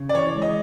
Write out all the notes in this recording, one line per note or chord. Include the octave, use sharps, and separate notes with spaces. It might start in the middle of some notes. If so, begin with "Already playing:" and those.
Already playing: C#3
D5
E3 C#5
G#3
D#5